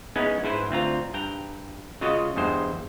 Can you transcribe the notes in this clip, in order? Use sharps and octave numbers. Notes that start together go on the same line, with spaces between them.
G#3 B3 C#4 D#4 E4
G#2 E4 B4 C5
D2 C4 F4 A#5
G2 G5 A#5
C#2 C#3 F4 F#4 D#5
E2 G2 G#3 C5